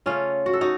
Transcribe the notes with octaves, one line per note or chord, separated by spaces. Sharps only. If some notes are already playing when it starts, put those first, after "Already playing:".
C#3 A3 C#4 F4
F#4
A4
D#4 F#4